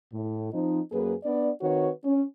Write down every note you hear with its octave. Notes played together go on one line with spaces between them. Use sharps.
A2
F3 C4 D#4
F#2 A#3 G#4 B4
B3 D4 D5
D#3 C4 F#4 B4 C#5
C#4